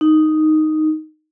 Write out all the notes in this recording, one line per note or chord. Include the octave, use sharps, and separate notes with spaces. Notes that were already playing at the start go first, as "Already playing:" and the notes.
D#4